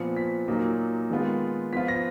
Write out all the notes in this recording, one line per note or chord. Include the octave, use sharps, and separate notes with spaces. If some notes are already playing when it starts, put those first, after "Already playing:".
Already playing: A#2 F3 B3 C#7
B6
A#2 F#3 A#3 D#4
D#3 G#3 B3 F4
F3 B3 F4 B6
A#6